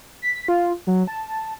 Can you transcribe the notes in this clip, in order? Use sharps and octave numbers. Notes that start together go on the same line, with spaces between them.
B6
F4
F#3
A5